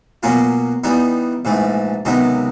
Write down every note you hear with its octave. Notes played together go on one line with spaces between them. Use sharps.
B2 F#3 A#3 C#4 F4
E3 G3 B3 D#4
A#1 G#2 E3 A3
C#2 C3 D#3 F#3 B3